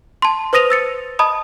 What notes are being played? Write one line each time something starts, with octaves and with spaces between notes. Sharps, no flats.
A5 C6
B4 C5 D#6 A#6 D#7 F7
E6 A6 C#7
D#5 A5 B5 D#6